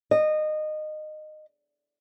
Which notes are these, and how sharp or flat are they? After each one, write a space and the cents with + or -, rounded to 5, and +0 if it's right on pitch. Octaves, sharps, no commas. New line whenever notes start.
D#5 -20